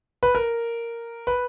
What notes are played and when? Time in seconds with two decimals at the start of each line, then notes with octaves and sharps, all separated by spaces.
0.23 B4
0.35 A#4
1.27 B4